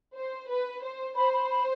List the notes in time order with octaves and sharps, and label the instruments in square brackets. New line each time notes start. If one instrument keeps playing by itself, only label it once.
[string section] C5
B4
C5
[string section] C5 [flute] B5
[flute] B5
B5